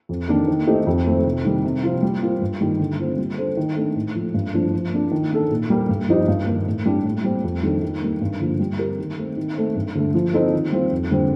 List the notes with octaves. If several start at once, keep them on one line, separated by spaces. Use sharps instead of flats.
F2
D#3 A#3 D4
D#3
A3 C4 D#4 G4
F2
D#3 A3 C4
C3
D#3 G3
C3
F3 C4 F4
G3
A#3 F4 C5
G2
D#3 G3
D3
A3 C4 F4
G3
D4 A4 C5
D#3
A3 D4
A2
F3 A3
G2
F3 A3 D4
F3
A#3 D4
D#3
A#3 D4 A4
A#2
G3 A#3
G2
F3 C4 D#4 G4
G2
D#3 A#3
A2
G3 D4 G4
A2
G3 C4
F2
D#3 G3 D4 A4
D#3
G3 A#3
G2
D3 F3 A#3
G3
C4 G4 A#4
D#3
A3 C4
D#3
A3 C4
G2
D3 A3
F3
C4 D#4 A4
D#3
G3 C4 F4
F2
D3 G3 C4